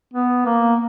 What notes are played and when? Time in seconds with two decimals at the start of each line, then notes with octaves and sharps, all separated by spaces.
0.13 B3
0.46 A#3